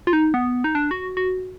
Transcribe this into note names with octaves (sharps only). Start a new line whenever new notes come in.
F4
D#4
B3
D#4
D4
F#4
F#4